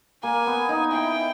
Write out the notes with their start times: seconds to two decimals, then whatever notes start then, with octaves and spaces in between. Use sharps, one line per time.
0.23 A#3 G#5
0.47 B3
0.69 D#4
0.91 E4 G5